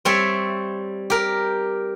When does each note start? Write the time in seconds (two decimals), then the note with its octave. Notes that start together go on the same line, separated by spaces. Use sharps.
0.05 G3 C4 C#5 E5
1.10 G4 A#4